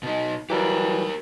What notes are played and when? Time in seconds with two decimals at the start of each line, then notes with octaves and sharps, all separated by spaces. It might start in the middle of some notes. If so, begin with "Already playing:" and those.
0.03 B2 D#4
0.50 E3 F#3 G3 G4 A#4